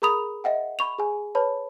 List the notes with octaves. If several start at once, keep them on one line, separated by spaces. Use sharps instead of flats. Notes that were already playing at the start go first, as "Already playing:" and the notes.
G#4 A#4 A#5 B5 D#6 F7
D#5 E5 F#5 G5
B5 C#6 F7
G#4 G#5
B4 C#5 A5 B5